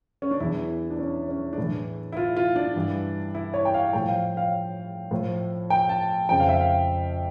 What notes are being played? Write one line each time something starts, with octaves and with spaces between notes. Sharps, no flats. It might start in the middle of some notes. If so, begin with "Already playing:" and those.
C#4
D4
E2 E3 E4
D4
C#4
C#4
D4
A2 E3 E4
E4
F4
F4
D4
G2 E3
E4
C#5
G5
F5
A2 F3 G5
F5
F5
A2 F3
G5
A5
F2 C#3 F3 G5
F5
E5
F5